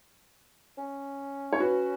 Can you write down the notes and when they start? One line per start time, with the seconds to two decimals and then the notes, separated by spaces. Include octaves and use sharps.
0.78 C#4
1.53 C#5
1.60 F#4 B4